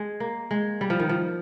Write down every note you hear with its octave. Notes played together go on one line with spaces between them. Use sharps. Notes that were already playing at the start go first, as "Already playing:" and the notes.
Already playing: G#3
A#3
G#3
G3
F3
D#3
F3